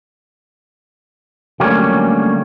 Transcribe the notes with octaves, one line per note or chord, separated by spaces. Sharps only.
D3 F#3 G3 A3 A#3 C#4